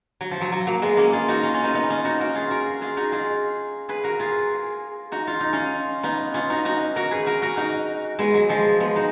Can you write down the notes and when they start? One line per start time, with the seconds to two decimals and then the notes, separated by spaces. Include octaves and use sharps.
0.21 F#3
0.31 F3
0.41 F#3
0.52 F#3
0.67 F#3 A#3
0.82 G#3 B3
0.97 A#3 C#4
1.13 F4 G#4
1.28 D#4 F#4
1.43 C#4 F4
1.54 C#4 F4
1.64 B3 D#4
1.74 B3 D#4
1.90 C#4 F4
2.04 D#4 F#4
2.20 F#4 A#4
2.35 F4 G#4
2.51 F#4 A#4
2.81 F4 G#4
2.97 D#4 F#4
3.12 F4 G#4
3.89 G#4 B4
4.04 F#4 A#4
4.20 F4 G#4
5.12 D#4 F#4
5.27 F4
5.41 D#4
5.53 C#4 F4
6.03 B3 D#4
6.34 C#4 F4
6.50 D#4 F#4
6.65 D#4 F#4
6.96 F#4 A#4
7.11 G#4 B4
7.26 F#4 A#4
7.42 F#4 A#4
7.57 D#4 F#4
8.19 G#3 B3
8.34 F#3
8.49 F3 G#3
8.80 G#3 B3
8.96 D#4 F#4